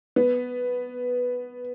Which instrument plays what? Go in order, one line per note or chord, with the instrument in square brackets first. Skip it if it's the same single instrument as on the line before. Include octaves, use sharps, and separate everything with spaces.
[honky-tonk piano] B3